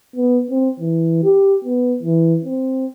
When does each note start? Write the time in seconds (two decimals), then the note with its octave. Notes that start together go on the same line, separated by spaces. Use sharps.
0.16 B3
0.51 C4
0.80 E3
1.24 G4
1.65 B3
2.03 E3
2.45 C4